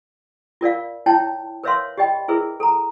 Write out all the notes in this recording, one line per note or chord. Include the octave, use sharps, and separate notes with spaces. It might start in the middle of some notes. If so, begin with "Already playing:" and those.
F4 A#4 D5 F5
D#4 E4 C#5 G5 A5
A#4 B4 C#5 E5 F5 C6
G4 D5 D#5 G5 B5
E4 G#4 A#4 B4 E5
A4 A#5